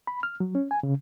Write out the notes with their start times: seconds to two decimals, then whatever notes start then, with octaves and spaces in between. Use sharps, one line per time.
0.07 B5
0.23 F6
0.40 F#3
0.55 C#4
0.71 G#5
0.83 C#3